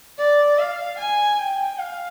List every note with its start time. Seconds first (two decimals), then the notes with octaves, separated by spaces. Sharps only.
0.18 D5
0.58 F5
0.98 G#5
1.39 G5
1.79 F5